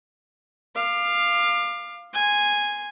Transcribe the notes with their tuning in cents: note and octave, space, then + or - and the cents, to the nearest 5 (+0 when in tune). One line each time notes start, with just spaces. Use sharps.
F5 +0 D6 +30
G#5 -5 C6 +0